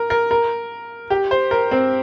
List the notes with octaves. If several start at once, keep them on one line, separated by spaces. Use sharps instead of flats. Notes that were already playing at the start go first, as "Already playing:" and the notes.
Already playing: A#4
A#4
A#4
G4
C5
A#4
C4